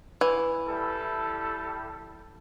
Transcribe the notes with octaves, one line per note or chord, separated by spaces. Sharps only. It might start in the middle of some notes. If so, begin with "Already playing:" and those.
E3
G3 E4 A4